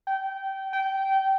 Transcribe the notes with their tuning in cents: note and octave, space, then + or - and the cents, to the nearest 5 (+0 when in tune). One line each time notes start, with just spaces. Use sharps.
G5 -20
G5 -20